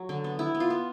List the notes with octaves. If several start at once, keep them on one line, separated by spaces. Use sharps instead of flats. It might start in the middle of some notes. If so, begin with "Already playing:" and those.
Already playing: F#3
D3
B3
B3 E4
B3
F4
B3